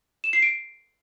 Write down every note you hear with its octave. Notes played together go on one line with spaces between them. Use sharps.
E7
C7
D7